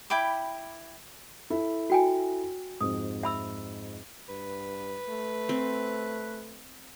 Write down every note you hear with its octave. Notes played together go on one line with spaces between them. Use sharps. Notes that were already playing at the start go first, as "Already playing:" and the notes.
E4 G5 B5 D6
E4 A4
F#4 G5 G#5
F2 G#2 D#6
E5 B5 E6
G2 B4
A3
C4